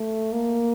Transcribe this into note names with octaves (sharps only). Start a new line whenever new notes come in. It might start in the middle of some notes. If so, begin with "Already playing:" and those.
Already playing: A3
A#3